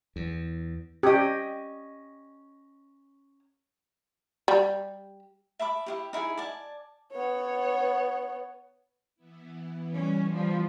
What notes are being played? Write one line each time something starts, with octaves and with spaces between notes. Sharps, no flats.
E2
C#4 G4 D#5
G3
E5 A5 B5 D6
E4 F4 G4
D#4 E4 G4 G#4
D5 G#5 A5
B3 C#5
E3 B3 E4
G3 C#4
F3 G3